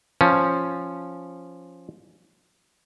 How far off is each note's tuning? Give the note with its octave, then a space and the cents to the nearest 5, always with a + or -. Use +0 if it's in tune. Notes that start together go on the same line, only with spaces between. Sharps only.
F3 +0 C#4 +0